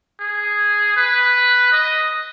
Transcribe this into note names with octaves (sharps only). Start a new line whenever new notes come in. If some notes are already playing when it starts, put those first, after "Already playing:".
G#4
B4
D#5